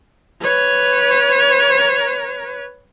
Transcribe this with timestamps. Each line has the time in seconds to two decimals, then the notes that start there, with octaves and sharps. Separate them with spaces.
0.43 B4 C#5